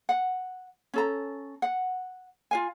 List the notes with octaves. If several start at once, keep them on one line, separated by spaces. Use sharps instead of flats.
F#5
C#4 A4 A#5
F#5
F4 F5 G#5